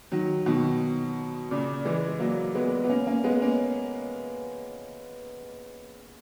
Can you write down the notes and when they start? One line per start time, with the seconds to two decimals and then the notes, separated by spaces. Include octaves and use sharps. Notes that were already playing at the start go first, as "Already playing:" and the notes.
0.12 D#3 F#3
0.46 B2 D#3
1.51 A#2 C#3
1.85 E3 G#3
2.20 F#3 A#3
2.55 G#3 B3
2.84 B3
2.89 A#3 C#4
3.07 A#3 C#4
3.24 G#3 B3
3.42 A#3 C#4